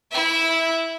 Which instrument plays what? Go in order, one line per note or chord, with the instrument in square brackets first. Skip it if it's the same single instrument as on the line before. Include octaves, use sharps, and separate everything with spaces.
[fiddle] E4 E5